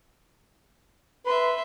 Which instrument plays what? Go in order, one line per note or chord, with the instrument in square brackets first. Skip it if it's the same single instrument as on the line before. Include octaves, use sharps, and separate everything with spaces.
[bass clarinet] B4 [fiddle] E5 C6